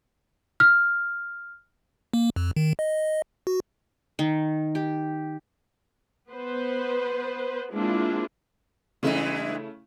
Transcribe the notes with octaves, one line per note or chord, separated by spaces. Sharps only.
F6
A#3
F2
D#3
D#5
F#4
D#3
G4
B3 B4 C5
G#3 A#3 C4 D4 E4 F4
G2 C#3 E3 G#3 A3 E4